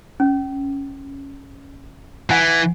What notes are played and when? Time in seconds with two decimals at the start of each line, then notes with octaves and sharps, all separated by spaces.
0.20 C#4
2.31 E3 F#5 G#5